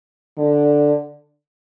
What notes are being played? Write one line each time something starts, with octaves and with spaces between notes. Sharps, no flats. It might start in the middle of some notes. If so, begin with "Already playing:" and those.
D3